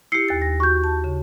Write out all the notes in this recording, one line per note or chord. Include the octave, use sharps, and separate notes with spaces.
E4 G4 C7 C#7
D#2 A6
A#6
F#4 C#6 G6
A5
C#3